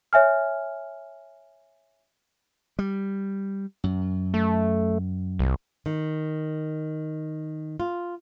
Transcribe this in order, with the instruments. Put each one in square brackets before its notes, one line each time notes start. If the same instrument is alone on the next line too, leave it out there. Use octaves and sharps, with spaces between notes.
[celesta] C#5 E5 G#5 F6
[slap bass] G3
F#2
[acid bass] A3
C2
[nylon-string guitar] D#3
F4